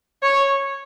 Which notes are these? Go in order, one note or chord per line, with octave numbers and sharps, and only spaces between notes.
C#5